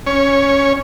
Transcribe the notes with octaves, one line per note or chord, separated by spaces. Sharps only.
C#4 C#5